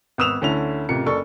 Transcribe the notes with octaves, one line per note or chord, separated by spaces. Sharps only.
G#1 B3 D#6 E6 E7 F7
D2 D3 C#4 E4 F7
A1 C3 F4 A#4 C#7
F#1 D4 A4 D5 C#6